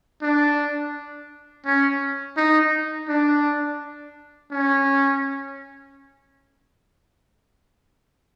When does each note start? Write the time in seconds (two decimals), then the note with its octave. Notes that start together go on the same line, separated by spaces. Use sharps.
0.22 D4
1.66 C#4
2.37 D#4
3.08 D4
4.51 C#4